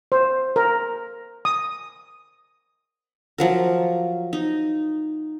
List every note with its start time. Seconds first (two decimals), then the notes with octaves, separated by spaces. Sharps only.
0.12 C5
0.56 A#4
1.45 D#6
3.38 F3 F#3 A#4
4.33 D#4